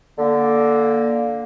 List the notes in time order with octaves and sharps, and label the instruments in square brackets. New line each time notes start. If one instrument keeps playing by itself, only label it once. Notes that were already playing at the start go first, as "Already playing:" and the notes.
[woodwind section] D3 A#3